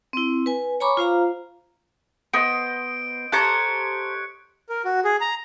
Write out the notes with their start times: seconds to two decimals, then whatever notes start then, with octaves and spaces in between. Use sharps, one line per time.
0.13 C4 E4
0.46 B4 G#5
0.80 C#5 G#5 A#5 B5 C#6 D6
0.97 F4 C5 F5 A#5
2.34 B3 C5 D#5 D7
3.32 G4 A4 C5 C#5 A#5 F#6 C#7
4.69 A#4
4.85 F#4
5.05 G#4
5.21 A#5